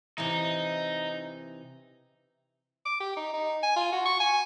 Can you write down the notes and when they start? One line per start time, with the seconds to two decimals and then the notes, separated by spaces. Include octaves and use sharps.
0.18 C3 E3 D#4
2.85 D6
3.00 G4
3.16 D#4
3.34 D#4
3.63 G#5
3.76 F4
3.92 F#4
4.05 C#6
4.20 G#5